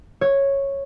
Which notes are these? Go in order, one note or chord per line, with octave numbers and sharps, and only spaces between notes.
C#5